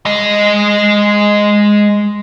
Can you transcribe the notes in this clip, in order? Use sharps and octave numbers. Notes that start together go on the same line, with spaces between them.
G#3 D#5